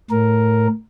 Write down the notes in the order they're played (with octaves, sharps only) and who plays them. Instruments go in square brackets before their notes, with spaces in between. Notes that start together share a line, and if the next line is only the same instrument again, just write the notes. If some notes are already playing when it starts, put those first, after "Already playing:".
[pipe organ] A2 A#4